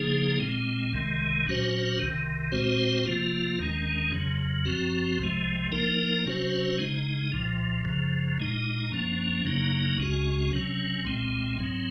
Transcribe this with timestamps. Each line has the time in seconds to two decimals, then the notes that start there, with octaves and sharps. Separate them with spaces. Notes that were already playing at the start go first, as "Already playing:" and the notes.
Already playing: C#3 F3 A#3 D#4 G#4
0.39 A#2 G#3 C4
0.93 C2 C3 D#3 G#3
1.46 A#2 F#3 C#4 F#4 C5
1.99 C2 C3 D#3
2.52 A#2 G#3 C4 F#4 C5
3.06 C3 F3 A#3 F4
3.59 D#2 D#3 G#3 C#4
4.12 F2 C#3 F#3
4.65 F#2 F3 C4 F#4
5.19 C2 C3 F3 G#3
5.72 F3 A#3 D#4 A#4
6.26 C3 F#3 C#4 F#4 C5
6.78 C#3 G#3 D#4
7.32 C2 A#2 F3
7.85 F#2 C#3 F3
8.38 A#2 G#3 D#4
8.92 F#2 F3 A#3 C#4
9.44 F#2 C#3 F#3 A#3 D#4
9.98 C#2 C#3 G#3 C#4 F#4
10.52 C3 F#3 C#4
11.05 C2 A#2 G#3 C4
11.58 G#2 F#3 C4